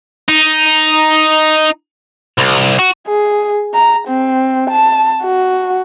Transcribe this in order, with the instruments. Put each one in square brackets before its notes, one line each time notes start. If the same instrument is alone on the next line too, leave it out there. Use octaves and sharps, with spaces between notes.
[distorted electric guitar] D#4
C2
F#4
[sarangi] G#4
A#5
C4
A5
F#4